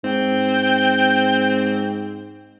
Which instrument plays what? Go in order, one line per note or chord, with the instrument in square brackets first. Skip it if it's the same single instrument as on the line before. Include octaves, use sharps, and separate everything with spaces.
[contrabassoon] G#2 [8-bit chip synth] C4 [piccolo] G5